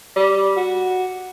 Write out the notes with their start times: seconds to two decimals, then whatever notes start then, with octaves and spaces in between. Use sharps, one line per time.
0.16 G3
0.57 F#4